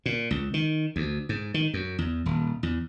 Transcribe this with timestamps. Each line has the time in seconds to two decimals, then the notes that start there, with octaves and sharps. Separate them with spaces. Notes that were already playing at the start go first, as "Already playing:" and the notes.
0.06 A#2
0.31 C#2
0.54 D#3
0.96 D2
1.29 G#2
1.54 D#3
1.74 F#2
1.98 E2
2.26 D#1
2.63 E2